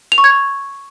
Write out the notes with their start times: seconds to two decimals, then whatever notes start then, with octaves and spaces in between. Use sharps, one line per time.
0.12 F7
0.18 C#6
0.24 G#6